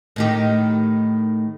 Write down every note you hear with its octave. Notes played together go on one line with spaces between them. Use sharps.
A2 D#3 G4